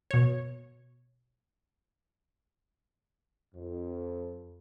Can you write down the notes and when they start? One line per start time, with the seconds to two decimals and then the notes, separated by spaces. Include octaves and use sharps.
0.11 B2 C#5
3.55 F2